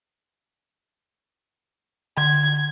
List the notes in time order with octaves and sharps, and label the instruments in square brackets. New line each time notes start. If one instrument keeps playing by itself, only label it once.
[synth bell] D3 [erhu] G#6